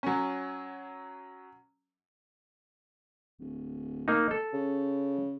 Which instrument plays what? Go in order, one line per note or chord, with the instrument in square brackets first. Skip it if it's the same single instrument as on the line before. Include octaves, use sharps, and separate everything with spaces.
[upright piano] F#3 C#4
[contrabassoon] D1
[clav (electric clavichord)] A#3 D#4
A4
[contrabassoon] C#3